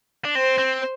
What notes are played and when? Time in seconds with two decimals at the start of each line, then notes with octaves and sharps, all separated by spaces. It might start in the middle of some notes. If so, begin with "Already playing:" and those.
0.25 D4
0.35 C4 C5
0.58 C4